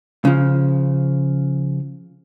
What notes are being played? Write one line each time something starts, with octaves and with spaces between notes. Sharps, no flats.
C#3 F3